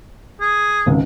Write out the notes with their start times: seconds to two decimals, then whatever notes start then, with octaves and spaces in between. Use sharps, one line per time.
0.41 G#4
0.86 G#1 C#2